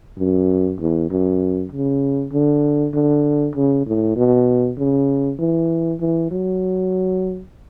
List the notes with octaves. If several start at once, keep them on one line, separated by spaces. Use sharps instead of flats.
F#2
E2
F#2
C#3
D3
D3
C#3
A2
B2
C#3
E3
E3
F#3